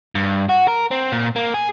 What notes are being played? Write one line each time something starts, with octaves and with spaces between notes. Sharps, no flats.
G2
F#4
A#4
C4
A#2
A#3
G#4